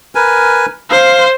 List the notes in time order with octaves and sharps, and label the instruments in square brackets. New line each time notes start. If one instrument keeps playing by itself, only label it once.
[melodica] A#4 B4 G#5
[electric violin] C5 [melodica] F5